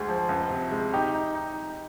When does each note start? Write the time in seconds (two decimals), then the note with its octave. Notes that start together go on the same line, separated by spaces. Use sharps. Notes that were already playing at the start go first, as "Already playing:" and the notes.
Already playing: D2 G#3 G#4
0.09 F3
0.29 C#2
0.50 C3
0.72 G#3
0.93 D#4 G4
1.14 D#4
1.35 D#4